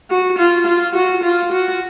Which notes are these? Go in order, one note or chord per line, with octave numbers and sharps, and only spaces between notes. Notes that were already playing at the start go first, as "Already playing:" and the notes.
F#4
F4
F4
F#4
F4
F#4